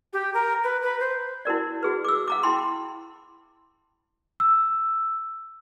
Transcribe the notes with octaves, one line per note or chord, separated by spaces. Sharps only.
G4
A#4
B4
B4
C5
E4 F#4 A#4 D5
F#4 G#4 B4
D6 E6
F5 A#5 D6
E4 G5 B5 C6
E6